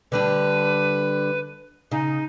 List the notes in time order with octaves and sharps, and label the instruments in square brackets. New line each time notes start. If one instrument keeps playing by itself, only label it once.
[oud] D3 G3 D4 [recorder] B4
[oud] C#3 [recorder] D#4